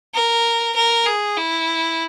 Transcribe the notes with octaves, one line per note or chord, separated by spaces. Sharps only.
A#4
A#4
G#4
E4